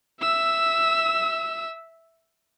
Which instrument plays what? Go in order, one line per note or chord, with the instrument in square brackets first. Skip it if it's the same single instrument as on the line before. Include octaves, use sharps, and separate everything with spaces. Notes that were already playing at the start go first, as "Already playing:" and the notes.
[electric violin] E5 E6